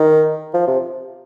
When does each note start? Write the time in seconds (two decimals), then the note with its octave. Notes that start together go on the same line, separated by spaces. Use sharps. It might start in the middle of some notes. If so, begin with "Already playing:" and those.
Already playing: D#3
0.54 F3
0.67 C3